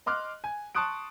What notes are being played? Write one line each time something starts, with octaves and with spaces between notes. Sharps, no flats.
D#5 C6 D6 F6 F#6
G#5
A5 C6 C#6 D#6 F#6 D7